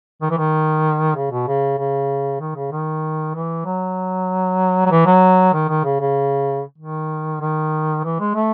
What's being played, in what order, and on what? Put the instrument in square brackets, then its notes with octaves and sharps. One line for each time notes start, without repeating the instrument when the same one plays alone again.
[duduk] D#3
E3
D#3
C#3
B2
C#3
C#3
D#3
C#3
D#3
E3
F#3
F#3
E3
F#3
D#3
D#3
C#3
C#3
D#3
D#3
E3
G#3
A3